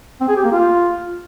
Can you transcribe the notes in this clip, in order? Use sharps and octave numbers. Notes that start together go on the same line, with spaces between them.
C4
G#4
G4
A#3
F4